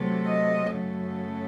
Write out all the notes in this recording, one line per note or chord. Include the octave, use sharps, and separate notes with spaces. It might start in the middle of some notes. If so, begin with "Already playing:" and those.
Already playing: C3 F#3 A3
D#5
F#2 C#3 F#3 A3